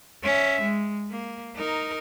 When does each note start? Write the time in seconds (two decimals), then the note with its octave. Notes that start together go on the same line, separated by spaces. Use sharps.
0.24 C#4 E5
0.62 G#3
1.11 A#3
1.56 D#4 A#4